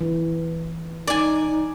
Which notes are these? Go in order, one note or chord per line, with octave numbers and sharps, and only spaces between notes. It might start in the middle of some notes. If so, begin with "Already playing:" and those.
E3
D#4 D5 G#5